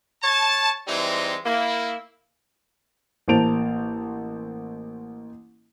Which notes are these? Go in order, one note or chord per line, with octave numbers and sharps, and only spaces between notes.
C#5 A5
E3 G3 G#3 C4 D#4
A#3 E4
A1 A#3 C5 A5 D7 F7